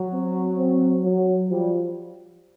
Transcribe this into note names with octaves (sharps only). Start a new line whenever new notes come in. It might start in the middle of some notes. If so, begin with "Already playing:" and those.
Already playing: F#3
C4
C4
F#3
F3 G3